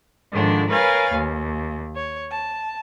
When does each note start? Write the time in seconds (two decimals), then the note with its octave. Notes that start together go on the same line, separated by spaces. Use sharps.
0.32 G#2 D3 D#3 F3 D4
0.69 A#4 B4 C#5 F5 G#5 A6
1.13 D#2
1.96 C#5
2.32 A5